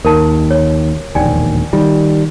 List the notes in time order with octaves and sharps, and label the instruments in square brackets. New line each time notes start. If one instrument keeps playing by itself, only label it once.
[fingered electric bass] D#2 [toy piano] A#4 A5
[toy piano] C#5
[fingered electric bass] E1 A#1 D#2 [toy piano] D5 G5 G#5
[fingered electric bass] D#3 G3 [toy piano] F4